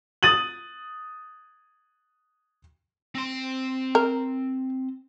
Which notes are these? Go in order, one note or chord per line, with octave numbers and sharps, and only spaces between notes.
D#6 A6 D#7 F#7
C4 C6
A#4